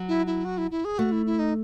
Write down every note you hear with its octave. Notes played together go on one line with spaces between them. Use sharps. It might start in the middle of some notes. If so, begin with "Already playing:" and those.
Already playing: F#3
E4
E4
F#4
E4
E4
G#4
A3 F#4
E4
E4
D#4